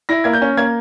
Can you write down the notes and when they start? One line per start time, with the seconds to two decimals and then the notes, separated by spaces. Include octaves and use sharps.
0.09 E4 A#6
0.24 A#3 G#6
0.33 G6
0.42 C#4
0.57 A#3 G#6